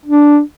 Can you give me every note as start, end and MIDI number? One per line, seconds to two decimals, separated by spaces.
0.05 0.40 62